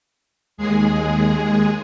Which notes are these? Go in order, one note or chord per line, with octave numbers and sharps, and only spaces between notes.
D#2 G#3 G#4